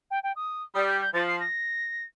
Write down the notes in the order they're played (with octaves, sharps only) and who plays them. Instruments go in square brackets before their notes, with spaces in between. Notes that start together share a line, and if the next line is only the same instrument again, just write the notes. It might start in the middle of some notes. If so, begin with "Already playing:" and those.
[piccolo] G5
G5
D#6
[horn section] G3 [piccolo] D#6
[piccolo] G6
G6
[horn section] F3 [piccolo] A6
[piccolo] C7
A#6